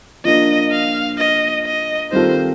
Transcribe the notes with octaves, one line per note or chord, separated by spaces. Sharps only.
F3 A#3 D4 D#5
F5
D#5
D#5
D#3 G3 C4 F4 A4 C5